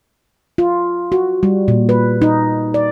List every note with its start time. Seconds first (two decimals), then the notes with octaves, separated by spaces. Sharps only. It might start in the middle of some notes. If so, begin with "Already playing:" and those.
0.58 F4
1.12 F#4
1.43 G3
1.68 A#2
1.89 B4
2.22 D#4
2.74 D5